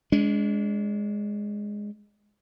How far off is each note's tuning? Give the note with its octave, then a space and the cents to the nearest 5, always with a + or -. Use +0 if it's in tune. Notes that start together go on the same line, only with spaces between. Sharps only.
G#3 +0 D4 -35